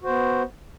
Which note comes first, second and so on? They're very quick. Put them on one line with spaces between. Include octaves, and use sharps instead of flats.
F#4 C5 B3